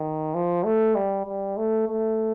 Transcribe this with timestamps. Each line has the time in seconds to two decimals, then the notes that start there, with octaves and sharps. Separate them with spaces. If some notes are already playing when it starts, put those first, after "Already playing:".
Already playing: D#3
0.34 F3
0.65 A3
0.95 G3
1.26 G3
1.57 A3
1.88 A3